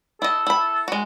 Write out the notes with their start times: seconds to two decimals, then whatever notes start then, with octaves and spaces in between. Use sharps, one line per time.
0.22 E4 A4 D#5
0.47 E4 B5
0.88 G#3 F#4